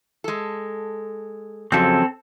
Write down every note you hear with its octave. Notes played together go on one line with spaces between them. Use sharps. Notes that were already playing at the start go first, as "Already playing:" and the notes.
G#3 A4
F2 C#3 F#3 C4 A4